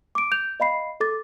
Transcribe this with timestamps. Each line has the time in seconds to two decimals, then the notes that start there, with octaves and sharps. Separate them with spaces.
0.15 D6 D7
0.32 G6 F7
0.60 D#5 F5 B5 C7
1.00 A4 D6 A6